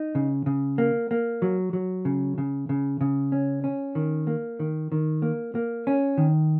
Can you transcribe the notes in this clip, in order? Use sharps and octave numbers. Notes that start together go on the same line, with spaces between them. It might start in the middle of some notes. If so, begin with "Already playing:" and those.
Already playing: D#4
C#3
C#3
A#3
A#3
F#3
F#3
C#3
C#3
C#3
C#3
C#4
C#4
D#3
A#3
D#3
D#3
A#3
A#3
C#4
D#3